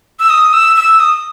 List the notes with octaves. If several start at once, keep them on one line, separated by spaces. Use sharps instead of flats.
E6
D#6
E6
E6
D#6